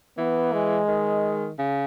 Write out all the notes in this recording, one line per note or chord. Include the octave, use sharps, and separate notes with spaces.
E3 B3
G#3
D#3
C#3